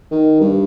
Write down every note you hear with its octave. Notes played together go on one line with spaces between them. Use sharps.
D#3
G2